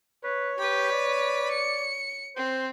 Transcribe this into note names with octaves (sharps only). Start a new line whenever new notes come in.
B4 C#5
G4 B4 B5
D5
C#7
C4 C5